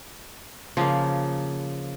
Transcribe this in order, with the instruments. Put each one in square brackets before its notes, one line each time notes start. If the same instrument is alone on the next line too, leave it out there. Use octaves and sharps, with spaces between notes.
[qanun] C#3 [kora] F3 A#3